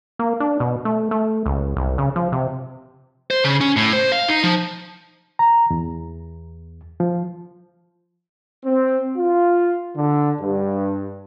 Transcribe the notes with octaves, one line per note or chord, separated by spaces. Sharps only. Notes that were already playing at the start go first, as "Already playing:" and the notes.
A#3
D4
B2
A3
A3
C#2
C2
C#3
F3
C3
C5
C#3
C#4
A2
C5
F5
D#4
F3
A#5
E2
F3
C4
F4
D3
G2